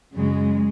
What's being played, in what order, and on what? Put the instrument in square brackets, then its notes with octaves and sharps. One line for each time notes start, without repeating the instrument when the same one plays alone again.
[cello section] F#2 C#3 F#3 G#3